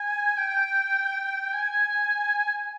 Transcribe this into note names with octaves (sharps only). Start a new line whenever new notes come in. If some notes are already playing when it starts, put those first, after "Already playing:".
Already playing: G#5
G5
G#5